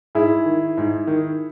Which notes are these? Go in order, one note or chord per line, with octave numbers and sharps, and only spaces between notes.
G#2 E4 G#4
D#3
G#2
D#3